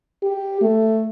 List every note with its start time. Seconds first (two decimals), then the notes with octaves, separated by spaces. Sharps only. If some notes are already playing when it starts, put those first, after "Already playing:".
0.23 G4
0.62 A3